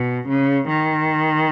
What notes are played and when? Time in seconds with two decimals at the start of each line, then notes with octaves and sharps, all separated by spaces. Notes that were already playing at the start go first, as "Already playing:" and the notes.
Already playing: B2
0.29 C#3
0.69 D#3